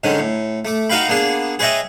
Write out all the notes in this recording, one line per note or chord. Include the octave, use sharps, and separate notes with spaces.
G#2 D3 D#3 C#4
A2
A3 D6
D#4 F#4 B4 F5 G5 B5
A#3 B3 D4 G#4
G#4 B4 C#5 D#5 E5 G5